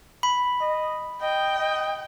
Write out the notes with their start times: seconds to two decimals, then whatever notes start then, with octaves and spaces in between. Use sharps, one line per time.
0.23 B5
0.61 D#5
1.22 D#5 G5
1.58 D#5